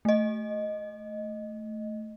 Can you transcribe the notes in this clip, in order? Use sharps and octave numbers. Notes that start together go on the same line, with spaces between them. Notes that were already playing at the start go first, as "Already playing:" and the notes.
A3 D#5